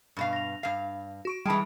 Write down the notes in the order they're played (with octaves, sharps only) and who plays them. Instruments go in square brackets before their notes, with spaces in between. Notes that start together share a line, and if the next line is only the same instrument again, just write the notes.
[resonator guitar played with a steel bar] G2 B2 F5
[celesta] A#6 F7
[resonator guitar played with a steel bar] G2 F5
[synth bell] F#4 C#6 D7
[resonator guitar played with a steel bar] E3 G#3 [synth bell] G3 D7 [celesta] G5 A5 B5